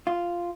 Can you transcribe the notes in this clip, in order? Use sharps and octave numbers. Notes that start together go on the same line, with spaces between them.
F4